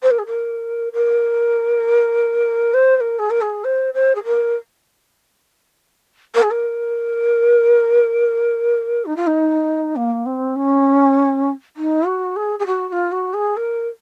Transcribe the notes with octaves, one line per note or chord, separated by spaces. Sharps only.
C5
A#4
G#4
A#4
A#4
C5
C5
A#4
G#4
A#4
G#4
C5
C5
G#4
A#4
A#4
G#4
A#4
D#4
F4
D#4
A#3
C4
C#4
D#4
F#4
G#4
G#4
F#4
F#4
F4
F#4
G#4
A#4